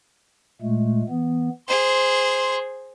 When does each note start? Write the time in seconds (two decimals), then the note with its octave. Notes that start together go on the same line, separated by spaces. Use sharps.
0.62 A#2 G#3 A3
1.09 E3 B3
1.68 G#4 C5 C6